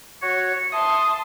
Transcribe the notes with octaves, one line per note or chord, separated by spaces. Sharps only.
F#4 C#5 C#7
E5 A5 C6 D#6